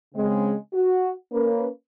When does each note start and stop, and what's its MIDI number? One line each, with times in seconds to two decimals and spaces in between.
0.14 0.53 49
0.14 0.53 56
0.14 0.53 60
0.73 1.10 66
1.32 1.65 58
1.32 1.65 61
1.32 1.65 71